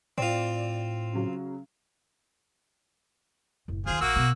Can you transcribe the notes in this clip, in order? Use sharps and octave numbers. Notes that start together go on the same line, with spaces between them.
A2 C4 F4 D5
C#3 F#3
F#1 A2
D#2 D#3 F4 G#4 C5
A#1 A#3 F#4 E6
B2